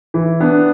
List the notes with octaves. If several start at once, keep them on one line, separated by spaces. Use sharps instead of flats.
E3
B3 D4